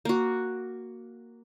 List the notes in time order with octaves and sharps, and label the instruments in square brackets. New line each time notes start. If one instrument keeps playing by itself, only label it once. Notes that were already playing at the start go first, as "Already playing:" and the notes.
[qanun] A#3 F#4